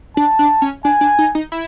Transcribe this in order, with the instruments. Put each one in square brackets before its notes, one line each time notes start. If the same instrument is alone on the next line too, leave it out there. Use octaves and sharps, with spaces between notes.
[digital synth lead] D4 [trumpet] A5
[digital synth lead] D4
C#4
[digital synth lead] D4 [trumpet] G#5
[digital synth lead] D4
D#4
D#4
E4